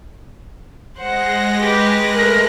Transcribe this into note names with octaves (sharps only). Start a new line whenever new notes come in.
G#3 C5 F#5 A#6
G4 B4
A3 A#4 B4 F#6